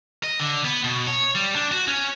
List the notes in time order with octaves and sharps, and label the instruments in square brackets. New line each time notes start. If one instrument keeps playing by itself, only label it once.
[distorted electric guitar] D#5
D3
B3
B2
C#5
G3
D4
F#4
C#4